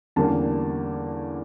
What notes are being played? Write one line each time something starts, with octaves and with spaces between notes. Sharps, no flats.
E2 D3 G3 A#3 C#4 A5